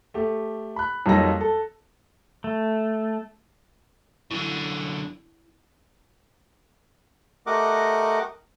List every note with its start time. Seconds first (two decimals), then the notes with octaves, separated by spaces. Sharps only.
0.14 A3 G4
0.76 B5 F#6
1.06 F2 F#3 G3 A#3 D#4 A#6
1.41 A4
2.44 A3
4.31 F#2 D3 E4
7.47 A3 G4 A#4 D#5 F#5 D6